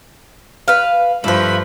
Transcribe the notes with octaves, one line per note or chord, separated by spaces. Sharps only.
B4 F5
G2 F3 A3 B4 B5